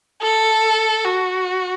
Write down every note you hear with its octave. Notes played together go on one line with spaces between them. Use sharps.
A4
F#4